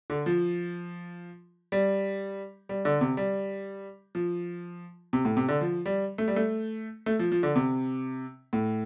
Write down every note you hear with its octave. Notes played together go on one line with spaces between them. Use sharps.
D3
F3
G3
G3
D3
C3
G3
F3
C3
A2
C3
D3
F3
G3
A3
G3
A3
A3
F3
F3
D3
C3
A2